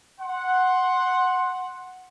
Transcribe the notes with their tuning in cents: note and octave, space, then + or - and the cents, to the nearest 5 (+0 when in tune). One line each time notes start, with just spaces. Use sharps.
F#5 +0 C6 +10